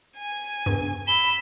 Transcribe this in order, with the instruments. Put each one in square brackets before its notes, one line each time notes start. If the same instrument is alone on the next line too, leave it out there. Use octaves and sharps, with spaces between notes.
[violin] G#5
[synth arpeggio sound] E2 G2
[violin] B5 E6 [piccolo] G7